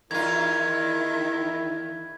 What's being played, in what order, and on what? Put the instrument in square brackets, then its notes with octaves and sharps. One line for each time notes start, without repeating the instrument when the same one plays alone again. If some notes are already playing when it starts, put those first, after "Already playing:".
[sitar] E2 F4 [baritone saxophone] D#3 [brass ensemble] E4 [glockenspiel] G#6